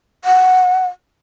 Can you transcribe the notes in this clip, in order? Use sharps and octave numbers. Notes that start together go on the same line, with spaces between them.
F#5